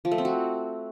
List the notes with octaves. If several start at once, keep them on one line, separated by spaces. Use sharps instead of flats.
F3
A3
C4
F#4